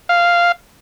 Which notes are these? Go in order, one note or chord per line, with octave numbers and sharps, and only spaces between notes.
F5